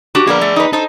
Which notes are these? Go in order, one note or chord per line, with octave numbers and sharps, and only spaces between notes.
D4 F#4 G4
A#3 B3 G#4 A#4 D5
A3
D#4 B4
D#4 A4 C5